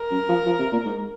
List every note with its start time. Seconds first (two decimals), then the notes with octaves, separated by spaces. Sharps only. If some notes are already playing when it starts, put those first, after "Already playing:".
Already playing: A#4
0.11 F#2
0.29 F3
0.46 F3
0.59 C3
0.72 A#2
0.85 G#2